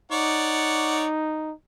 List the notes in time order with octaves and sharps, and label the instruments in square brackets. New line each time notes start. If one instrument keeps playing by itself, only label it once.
[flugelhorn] D#4 [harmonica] C#5 D5 F#5